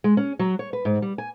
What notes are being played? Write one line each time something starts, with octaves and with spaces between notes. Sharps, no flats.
G#3
C#4
F#3
C#5
B4
G#2
G3
G#5